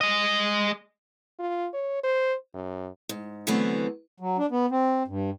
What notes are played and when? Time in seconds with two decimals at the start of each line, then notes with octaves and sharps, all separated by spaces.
0.01 G#3 D#5
1.39 F4
1.74 C#5
2.04 C5
2.54 F#2
3.09 G#2
3.47 D3 E3 F#3 A3 B3 C4
4.20 F#3
4.38 D4
4.51 B3
4.71 C4
5.08 G2